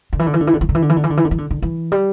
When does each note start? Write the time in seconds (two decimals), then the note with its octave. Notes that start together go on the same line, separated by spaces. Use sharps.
0.13 D3
0.19 E3
0.26 D3
0.34 E3
0.40 D3
0.47 E3
0.54 D3
0.61 E3
0.69 D3
0.75 E3
0.82 D3
0.89 E3
0.97 D3
1.04 E3
1.10 D3
1.17 E3
1.25 D3
1.31 E3
1.38 D3
1.51 D3
1.62 E3
1.92 G3